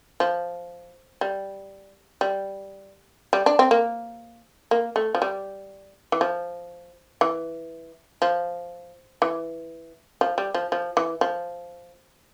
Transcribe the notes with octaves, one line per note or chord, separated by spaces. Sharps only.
F3
G3
G3
G3
D4
C4
A#3
A#3
A3
F3
G3
E3
F3
E3
F3
E3
F3
G3
F3
F3
E3
F3